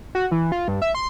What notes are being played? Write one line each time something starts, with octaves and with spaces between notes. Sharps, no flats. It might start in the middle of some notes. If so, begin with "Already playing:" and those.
F#4
E3
F4
G2
E5
C6